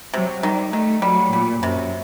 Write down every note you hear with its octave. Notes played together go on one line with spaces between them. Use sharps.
C3 F#3
D#3 G3
D#3 A3
F#3 G3
A#2 G3
F#2 C3